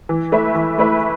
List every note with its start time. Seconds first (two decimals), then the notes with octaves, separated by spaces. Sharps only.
0.09 E3
0.32 A3 E4 B4 E5
0.55 E3
0.78 A3 E4 B4 E5